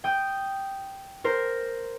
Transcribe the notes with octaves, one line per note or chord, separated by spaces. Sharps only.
G5 D#6
A#4 C5